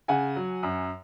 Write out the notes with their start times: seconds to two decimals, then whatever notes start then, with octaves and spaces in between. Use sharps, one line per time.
0.08 C#3 F#5 G#5
0.36 F#3
0.63 F#2